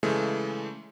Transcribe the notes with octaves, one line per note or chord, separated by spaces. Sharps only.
C#3 E3 G#3 A3